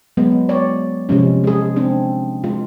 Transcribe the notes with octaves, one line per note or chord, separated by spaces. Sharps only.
F#3 G#3 B3
C#5 D5
C3 F3 G#3 C#4
G#3 G#4
C4 D4
G#3 F4